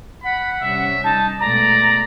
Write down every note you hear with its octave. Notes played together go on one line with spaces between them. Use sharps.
F#5 B5
C3 G3 C#4 E5
D#4 A5
B2 G#3 A3 D5 A#5